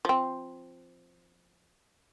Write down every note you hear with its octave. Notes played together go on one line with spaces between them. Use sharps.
F3 C4